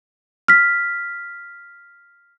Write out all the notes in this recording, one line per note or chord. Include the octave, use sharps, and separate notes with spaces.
F6 B6